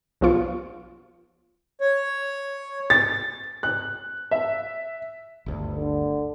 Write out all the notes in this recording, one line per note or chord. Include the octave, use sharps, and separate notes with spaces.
B1 F3 B3 F4 C#6
C#5
A6
F#6
E5
G1 D2
D3